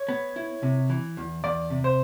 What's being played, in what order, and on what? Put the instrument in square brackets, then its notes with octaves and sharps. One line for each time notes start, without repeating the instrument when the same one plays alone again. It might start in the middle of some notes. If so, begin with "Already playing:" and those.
Already playing: [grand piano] C#5
[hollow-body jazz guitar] B3
E4
C3
E3
E2
[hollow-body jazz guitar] E2 [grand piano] D5
[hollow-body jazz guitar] C3
[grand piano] C5